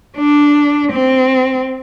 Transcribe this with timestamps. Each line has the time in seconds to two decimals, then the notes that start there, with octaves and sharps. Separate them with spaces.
0.18 D4
0.92 C4